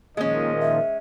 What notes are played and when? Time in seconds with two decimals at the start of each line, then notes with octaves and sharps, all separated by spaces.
0.17 A#2 D#3 F3 G#3 A#3 C#4 D#5
0.61 E5